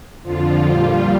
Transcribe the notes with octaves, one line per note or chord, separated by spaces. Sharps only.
F2 D3 F3 F4
A#2 G3